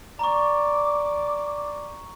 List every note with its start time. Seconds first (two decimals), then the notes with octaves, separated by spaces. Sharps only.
0.19 D5 A#5 C#6 D6